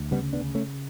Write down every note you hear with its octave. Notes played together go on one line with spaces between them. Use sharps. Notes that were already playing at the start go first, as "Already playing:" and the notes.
Already playing: D2
C#3 G3 B3
B3 D4
C#3
A3 C#4